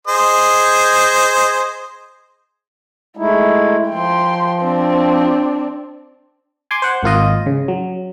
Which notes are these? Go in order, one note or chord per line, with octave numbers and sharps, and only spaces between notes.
G#4 C5 D#5
G#3 A3 D#4 E4
F3 G5 C6
C4 D4
G#5 C6 D6
C5 F#5
G#1 A#3 F4 D#5
C#3
F#3